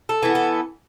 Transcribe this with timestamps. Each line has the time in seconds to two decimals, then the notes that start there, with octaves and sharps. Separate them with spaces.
0.09 A4
0.23 E3 B3
0.35 A4